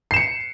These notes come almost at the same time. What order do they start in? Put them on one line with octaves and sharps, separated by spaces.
C7 E7 C#7